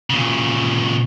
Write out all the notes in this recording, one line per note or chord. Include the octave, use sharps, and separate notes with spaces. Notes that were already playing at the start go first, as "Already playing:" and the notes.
A#2 C#3